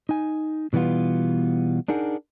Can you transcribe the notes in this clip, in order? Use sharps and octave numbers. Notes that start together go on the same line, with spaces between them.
D#4 G#5
B2 E3 G3 B3 F4
D4 D#4 G#4 A#4 F#5